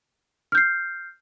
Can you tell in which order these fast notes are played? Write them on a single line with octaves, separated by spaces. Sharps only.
F6 G6 C7